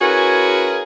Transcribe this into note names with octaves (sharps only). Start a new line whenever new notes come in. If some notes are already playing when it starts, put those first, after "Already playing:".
C#4 E4 F#4 G#4 A#4 B4